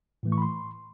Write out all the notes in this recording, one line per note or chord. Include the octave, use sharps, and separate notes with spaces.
A2 E3 A3
C#6
B5
C6